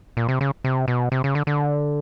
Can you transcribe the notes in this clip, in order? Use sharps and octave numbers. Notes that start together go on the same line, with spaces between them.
A#2
C3
C#3
C3
B2
C3
C#3
D3
D3